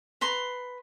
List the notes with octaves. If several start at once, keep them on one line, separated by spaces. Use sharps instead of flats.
B4 A#5 C6